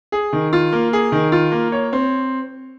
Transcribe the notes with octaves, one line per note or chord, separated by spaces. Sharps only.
G#4
D#3
F4
A#3
G#4
D#3
F4
A#3
C#5
C4